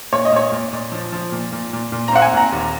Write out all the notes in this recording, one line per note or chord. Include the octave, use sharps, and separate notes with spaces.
A#2 C#5
D#5
A#2 C#5
A#2
A#2
F3
F3
A#2
A#2
A#2
A#2
A#5
C4 F#5
G#5
A#2 A#5
D#2